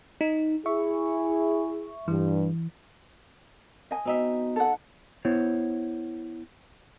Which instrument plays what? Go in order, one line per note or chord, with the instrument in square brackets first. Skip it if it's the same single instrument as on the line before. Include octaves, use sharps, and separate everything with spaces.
[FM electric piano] D#4
[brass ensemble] E4 G#4 [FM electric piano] E5 C#6
[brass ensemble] G2 [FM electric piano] E3
[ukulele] D#5 G#5
[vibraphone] B3 F#4 [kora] C4 D#4 E5
[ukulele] A4 F#5
[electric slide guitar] B3 E4 C5 C#5